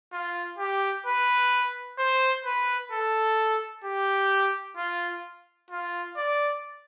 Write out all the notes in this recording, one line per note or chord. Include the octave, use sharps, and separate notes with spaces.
F4
G4
B4
C5
B4
A4
G4
F4
F4
D5